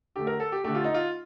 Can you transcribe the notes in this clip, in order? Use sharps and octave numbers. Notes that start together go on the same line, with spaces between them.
D3 A3 G4
A#4
A4
G4
D3 A3 G4
F4
D#4
F4